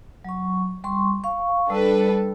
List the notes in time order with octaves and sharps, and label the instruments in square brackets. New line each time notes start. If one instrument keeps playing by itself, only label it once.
[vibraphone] F#3 C#6
G3 C6 C#6
F5 C#6
[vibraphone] G3 E6 [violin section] D4 A4 B4